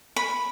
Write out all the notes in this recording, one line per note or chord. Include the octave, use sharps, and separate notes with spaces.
B5